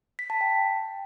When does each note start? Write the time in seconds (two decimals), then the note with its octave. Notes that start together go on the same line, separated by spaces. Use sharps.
0.19 B6
0.30 A5
0.41 G5